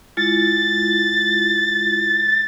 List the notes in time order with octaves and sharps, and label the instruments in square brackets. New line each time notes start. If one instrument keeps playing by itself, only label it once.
[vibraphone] G#3 E4 F4 [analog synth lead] A6